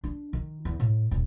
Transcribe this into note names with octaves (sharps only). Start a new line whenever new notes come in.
D4
D#3
E2
A2
D#1